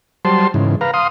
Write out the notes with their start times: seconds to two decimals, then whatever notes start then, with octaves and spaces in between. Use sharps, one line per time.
0.25 F#3 G3 C5 A5 C6
0.54 G#2 C#3 E3
0.81 B4 F5 A#5
0.94 F5 C6 D#6